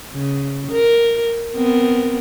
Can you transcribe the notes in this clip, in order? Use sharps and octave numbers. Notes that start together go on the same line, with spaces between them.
C#3
A#4
B3 C4 A#4